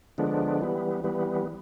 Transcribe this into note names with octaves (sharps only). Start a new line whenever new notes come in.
D3 F3 G#3 B3 D4
E3 G3 B3
E3 G3 B3